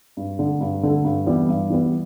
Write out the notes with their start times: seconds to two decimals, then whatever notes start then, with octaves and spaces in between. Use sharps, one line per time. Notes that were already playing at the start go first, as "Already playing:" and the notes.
0.17 G2
0.39 D3 A3
0.61 G2
0.83 D3 A3
1.04 G2
1.27 E3 G3 B3 E4
1.49 G2
1.70 E3 G3 B3 E4